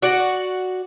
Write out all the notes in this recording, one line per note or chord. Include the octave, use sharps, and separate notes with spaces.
F#4 D5